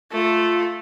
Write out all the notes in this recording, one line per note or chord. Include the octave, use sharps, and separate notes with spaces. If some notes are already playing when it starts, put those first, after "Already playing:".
A3 F4